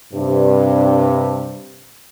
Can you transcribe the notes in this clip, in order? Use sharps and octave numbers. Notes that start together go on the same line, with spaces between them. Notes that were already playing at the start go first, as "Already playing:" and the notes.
G2 C3